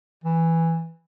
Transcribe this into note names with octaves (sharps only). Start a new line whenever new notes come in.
E3